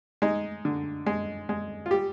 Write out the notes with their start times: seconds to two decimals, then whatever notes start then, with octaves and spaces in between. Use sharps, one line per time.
0.22 G#3 D#4
0.65 D3
1.06 G#3
1.49 G#3
1.86 F4
1.91 G3 G4